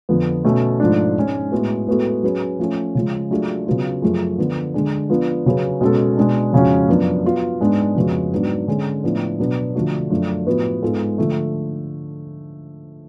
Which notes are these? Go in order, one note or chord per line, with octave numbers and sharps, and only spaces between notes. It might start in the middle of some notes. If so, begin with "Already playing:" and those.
F2 D3 F3 B3
B2 A3 C#4
G#2 F3 A3 D4
G#2 G#3 C#4
A2 G#3 B3 F#4
A2 G#3 B3 F#4 A4
F#3 C#4 G#4 B4
F3 A3 C#4
C#3 F3 G#3
F#3 A3 D4 F4 G#4
C#3 F#3 B3 F4
F#2 F3 A3 F4 G#4
D3 F3 B3
D3 G#3 D4 G#4
F3 B3 D4 F4
C#3 F#3 C#4 G#4 B4
B2 G#3 C#4 F#4 A4
B2 G#3 D4
F2 C#3 G#3 C#4 F#4
F#2 F3 B3 D4
F#3 B3 F4
G#2 G#3 B3 D4
F2 C#3 G#3 B3 F#4
G#2 F#3 B3 D4
D3 G#3 C#4 G#4
A2 F3 B3 D4
B2 F#3 B3 D4
D3 F3 A3 D4 F#4
F#2 F3 A3 D4 F4
A2 F3 B3 F#4 B4
G#2 G#3 B3 F4 A4
D3 F3 A3